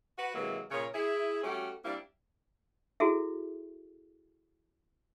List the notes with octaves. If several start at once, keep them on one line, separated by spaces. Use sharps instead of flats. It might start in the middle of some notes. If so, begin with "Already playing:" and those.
F#4 B4
C3 E3 F#3 G#3 A#3
A#2 C#3 G#4 A#4 C#5
E4 G#4
G3 A3 C#4 F#4 G4
G3 A#3 C4 D4 E4
E4 F#4 G#4 A4 E5